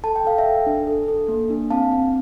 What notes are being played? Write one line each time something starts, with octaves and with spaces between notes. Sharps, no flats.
A4 A5
G5
A4 F5
E5 G5
A4
D4
A4
A4
A#3
D4
C4 F5 A5
C4